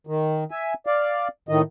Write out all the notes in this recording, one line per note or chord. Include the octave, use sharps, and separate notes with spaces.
D#3
E5 G#5
D5 F5
A2 D#3 D#5